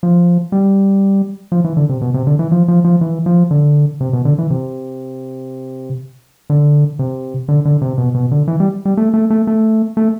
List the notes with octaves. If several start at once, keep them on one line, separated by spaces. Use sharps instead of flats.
F3
G3
F3
E3
D3
C3
B2
C3
D3
E3
F3
F3
F3
E3
F3
D3
C3
B2
D3
E3
C3
D3
C3
D3
D3
C3
B2
B2
D3
E3
G3
G3
A3
A3
A3
A3
A3